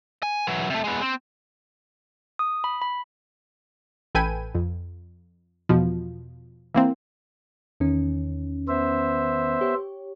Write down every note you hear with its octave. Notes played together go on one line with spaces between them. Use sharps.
G#5
E3 F#3
C3 A3
G#3 B3
C4
D#6
B5
B5
A1 A4 B4 G5 G#5 D#7
F2
E2 B2 F3
E3 A#3 C4
E2 D#3 C#4
B3 C5 E5
G4 C#5